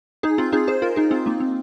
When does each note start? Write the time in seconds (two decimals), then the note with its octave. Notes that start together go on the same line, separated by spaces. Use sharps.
0.23 D#4 G#4
0.38 C4 F4
0.52 D#4 G#4
0.68 G#4 C5
0.82 F4 A#4
0.96 D#4 G#4
1.11 C4 F4
1.26 A#3 D#4
1.40 C4